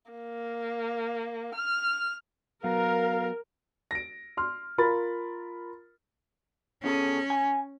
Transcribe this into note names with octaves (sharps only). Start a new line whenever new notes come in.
A#3
F6
F#3 B3 F#4 A#4 F5
A#6 D7
C6 F6
F4 A#4 B5 A6
B2 C#4 G#4 A4
G#5